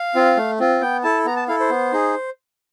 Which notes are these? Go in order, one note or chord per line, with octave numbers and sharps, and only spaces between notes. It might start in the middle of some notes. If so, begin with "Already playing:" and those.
Already playing: F5
C4 F4
A3
C4 F4
B3 G5
E4 A4 A5
B3 A#5
A5
E4 A4 F5
C5
B3
D#4 G#4